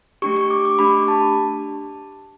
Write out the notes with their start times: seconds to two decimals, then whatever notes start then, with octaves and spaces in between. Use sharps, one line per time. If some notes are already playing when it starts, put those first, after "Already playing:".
0.22 A3 D4 G4 C#6
0.37 C#6
0.50 D6
0.65 D6
0.79 A3 D4 G4 B5
1.08 A5